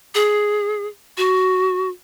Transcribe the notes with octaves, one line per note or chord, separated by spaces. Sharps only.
G#4
F#4